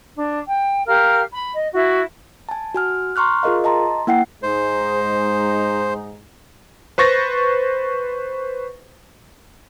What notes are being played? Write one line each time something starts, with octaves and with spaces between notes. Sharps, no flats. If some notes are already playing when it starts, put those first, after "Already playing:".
D4
G5
G4 A#4 F5 F6
B5
D#5
E4 F#4
G#5 A5
F#4 G#5 F6
A#5 C6 C#6 F6 F#6
F4 G#4 A#4 D#5 F5
D#5 A5 A#5 C6
A#3 E4 F#5 G5 C7
G#2 G#3 D#4 C5
B4 C5 C#6 A6 A#6